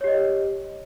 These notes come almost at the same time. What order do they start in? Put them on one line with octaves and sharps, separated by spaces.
C#5 G4 D#5